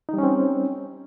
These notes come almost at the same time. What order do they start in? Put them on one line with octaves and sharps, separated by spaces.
D#4 G3 C#4 C4